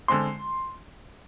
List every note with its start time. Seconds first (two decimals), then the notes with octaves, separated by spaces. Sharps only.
0.08 D3 G#3 C4 C6